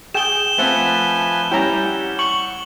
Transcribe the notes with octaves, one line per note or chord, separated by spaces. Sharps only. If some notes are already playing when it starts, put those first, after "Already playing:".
G#4 G5 E7 G7
F3 A3 C4 B4 F#5 G#5
G3 C#4 E4 G5 A#5
F#5
C#6 F#7